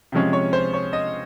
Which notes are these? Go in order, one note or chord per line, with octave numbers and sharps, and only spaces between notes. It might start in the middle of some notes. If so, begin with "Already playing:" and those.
C3 F3 G#3 C#4
C#5
C5
C#5
D#5